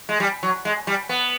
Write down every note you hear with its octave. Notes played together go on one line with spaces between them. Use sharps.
G#3
G3
F#3
G#3
G3
B3